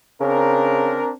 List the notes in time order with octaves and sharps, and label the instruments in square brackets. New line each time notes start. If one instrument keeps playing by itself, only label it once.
[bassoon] C#3 [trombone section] C4 D4 A#4